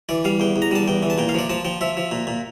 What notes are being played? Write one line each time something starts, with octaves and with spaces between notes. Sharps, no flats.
E3 D5
G3 F5
E2 G5
E2
A#5
G3 A5
E2 G5
E3
A5
A#2 G5
F5
F3 D5
F3 A5
F3 G5
F3 E5
F3
A#2
A#2